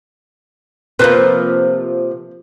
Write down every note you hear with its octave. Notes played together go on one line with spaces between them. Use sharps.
C3 F3 A#3 B4 C5